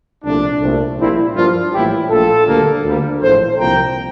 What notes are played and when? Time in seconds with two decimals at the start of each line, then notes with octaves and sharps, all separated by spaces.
0.24 C2 A#2 F3 A3 D4
0.61 C2 A#2 A3
0.98 A#1 A#2 G3 A#3 C4 E4
1.35 G2 F3 A#3 D4 F4
1.72 A#1 A2 E3 G3 A#3 E4 G4
2.10 A#1 A#2 A3 F4 A4
2.47 D2 D3 G3 A#3
2.84 D2 D3 G3 A#3
3.21 A#1 A2 E3 A4 C5
3.59 C2 A#2 F3 A#3 G5 A#5